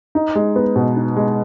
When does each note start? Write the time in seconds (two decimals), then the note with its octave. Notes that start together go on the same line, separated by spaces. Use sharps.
0.15 D#4
0.35 G#3
0.56 B3
0.76 B2
0.96 D#4
1.17 G#3